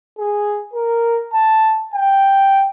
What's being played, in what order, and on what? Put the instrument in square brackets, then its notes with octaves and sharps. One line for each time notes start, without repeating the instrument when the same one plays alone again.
[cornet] G#4
A#4
A5
G5